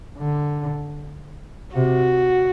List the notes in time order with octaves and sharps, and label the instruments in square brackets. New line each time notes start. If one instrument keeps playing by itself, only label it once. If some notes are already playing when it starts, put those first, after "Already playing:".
[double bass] D3
[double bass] C3 [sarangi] F#4